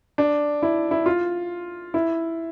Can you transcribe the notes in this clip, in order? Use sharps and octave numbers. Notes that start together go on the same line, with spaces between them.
D4
E4
E4
F4
E4